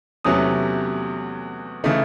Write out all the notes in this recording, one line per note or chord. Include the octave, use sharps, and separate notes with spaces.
E2 C3 F#3 A3 C#4 D#6
C#3 E3 A3 D#4